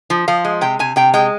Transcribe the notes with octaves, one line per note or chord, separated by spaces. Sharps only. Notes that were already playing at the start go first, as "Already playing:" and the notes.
F3
F3 F5
G#3
C3 G5
C3 G#5
C3 G5
G#3 G5